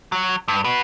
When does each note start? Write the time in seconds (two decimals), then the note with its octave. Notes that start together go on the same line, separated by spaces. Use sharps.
0.12 F#3
0.48 G2
0.65 F#4 B4